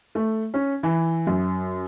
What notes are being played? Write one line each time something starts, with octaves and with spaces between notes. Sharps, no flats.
A3
C#4
E3
F#2